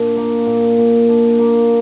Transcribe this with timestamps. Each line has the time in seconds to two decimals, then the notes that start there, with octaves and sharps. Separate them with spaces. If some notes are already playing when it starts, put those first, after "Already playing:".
Already playing: A#2 D4
0.17 A#3
0.46 A#2
0.78 A#2
1.09 D4
1.39 A#3